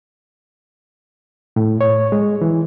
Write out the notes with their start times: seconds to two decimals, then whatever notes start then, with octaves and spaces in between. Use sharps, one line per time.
1.56 A2
1.81 C#5
2.12 G#3
2.42 E3